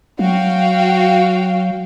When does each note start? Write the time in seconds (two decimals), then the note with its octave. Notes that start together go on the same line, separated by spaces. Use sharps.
0.19 F#3 F#4 F5 G5